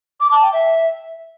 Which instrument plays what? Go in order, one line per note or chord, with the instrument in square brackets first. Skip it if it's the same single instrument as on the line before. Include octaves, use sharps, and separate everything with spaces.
[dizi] D6
A5
G5
E5